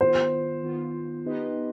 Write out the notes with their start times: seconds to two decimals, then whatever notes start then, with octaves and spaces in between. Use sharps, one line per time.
0.01 D#3 B3 F4 C5
0.63 D#3 B3 F4
1.26 B3 D#4 G4 B4 D#5